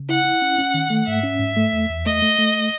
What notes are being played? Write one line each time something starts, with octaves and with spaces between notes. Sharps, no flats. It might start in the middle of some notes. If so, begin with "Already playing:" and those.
Already playing: C#3
E4 F#5
E4
C#4
C#4
D#3
A3
G#2 E5
C#4
G#2
A3
E2
E2
A3 D#5
A3
A3